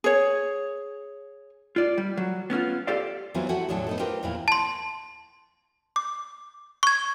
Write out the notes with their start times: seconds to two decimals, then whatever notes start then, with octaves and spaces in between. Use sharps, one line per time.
0.04 G#4 C#5
1.76 F4 D5
1.98 G3
2.17 F#3
2.50 B3 C#4 E4 F4
2.87 G4 A4 C5 D5 F5
3.34 E3 F#3 G3 B3 C4 F4
3.49 E4 F#4 G4 A4 F#5 G#5
3.69 E2 A2 D3 F#3 F#4 A5
3.87 B3 D#4 A4
3.99 C4 F4 G4 A#4 B4
4.23 E2 A#2 C4 E4 F5
4.48 A5 C6
5.96 D6
6.83 C#6 G#6